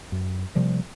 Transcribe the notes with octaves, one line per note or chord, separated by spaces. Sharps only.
F#2
C3 F3 G3 A#3